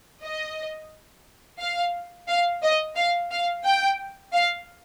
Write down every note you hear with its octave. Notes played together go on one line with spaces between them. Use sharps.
D#5
F5
F5
D#5
F5
F5
G5
F5